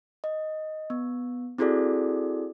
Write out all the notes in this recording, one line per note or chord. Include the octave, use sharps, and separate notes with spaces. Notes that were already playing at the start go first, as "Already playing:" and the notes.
D#5
B3
C4 E4 F#4 G#4 A4 D5